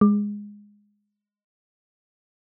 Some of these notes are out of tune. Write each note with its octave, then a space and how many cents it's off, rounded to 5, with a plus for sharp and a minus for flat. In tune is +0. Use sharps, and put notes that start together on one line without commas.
G#3 -10